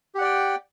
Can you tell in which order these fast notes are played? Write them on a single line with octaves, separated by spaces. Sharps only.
G4 F#5 D5 G5